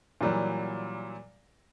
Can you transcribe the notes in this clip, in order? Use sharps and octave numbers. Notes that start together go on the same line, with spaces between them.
A#2 E3 F#3 G3